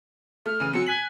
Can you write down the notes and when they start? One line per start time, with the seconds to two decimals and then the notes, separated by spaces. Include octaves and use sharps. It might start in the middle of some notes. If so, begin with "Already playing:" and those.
0.46 A3 F6
0.60 C#3 E3 D#7
0.73 F#3 C4 C#7
0.86 G#5 F#6 B6 F#7